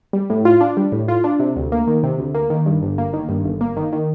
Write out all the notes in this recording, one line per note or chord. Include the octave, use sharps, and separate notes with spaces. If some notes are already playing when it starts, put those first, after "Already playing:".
G3
A2
F4
D4
G3
A2
F4
D4
C3
D2
A#3
D#3
C3
D2
A#3
D#3
G2
G1
A#3
D#3
G2
G1
A#3
D#3
D#3